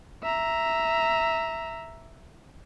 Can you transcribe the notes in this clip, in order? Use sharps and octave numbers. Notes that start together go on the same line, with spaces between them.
E5 A#5